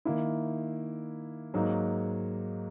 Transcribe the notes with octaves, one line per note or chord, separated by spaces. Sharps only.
D#3 A#3 E4
G#2 F#3 A#3 D#4 F#4